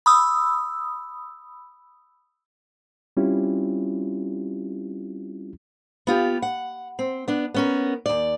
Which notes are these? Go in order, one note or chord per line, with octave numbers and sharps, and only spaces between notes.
B5 D#6 E6
G3 C4 C#4 E4 F4 G4
B3 F4 G4
F#5
C4
B3 D4
B3 C#4 A#4
D#2 D5